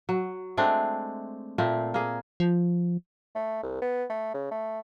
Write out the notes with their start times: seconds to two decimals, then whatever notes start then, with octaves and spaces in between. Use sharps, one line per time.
0.09 F#3
0.57 G#3 A3 C4 D4
1.58 A#2 A3 C4
1.94 A#3 G#4
2.40 F3
3.35 A3
3.63 C2
3.81 B3
4.10 A3
4.34 C#3
4.51 A3